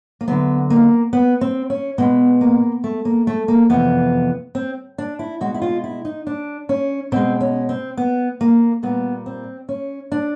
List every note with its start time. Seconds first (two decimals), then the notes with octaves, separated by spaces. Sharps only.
0.21 A#3
0.28 D2 D3 F#3 B3
0.70 A#3
1.13 B3
1.41 C4
1.70 C#4
1.98 B2 G#3 B3
2.41 A#3
2.84 A3
3.05 A#3
3.27 A3
3.48 A#3
3.70 F2 C3 E3 B3
4.55 C4
4.98 D4
5.19 E4
5.41 B2 G#3 F#4
5.54 E4
5.62 F4
5.84 E4
6.05 D#4
6.27 D4
6.69 C#4
7.12 B2 G#3 C4
7.41 C#4
7.69 C4
7.97 B3
8.41 A#3
8.83 A#2 G3 B3
9.26 C4
9.69 C#4
10.12 D4